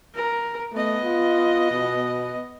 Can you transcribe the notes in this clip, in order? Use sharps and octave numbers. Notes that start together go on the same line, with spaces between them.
A#4
A3 B3 D#5
F4
B2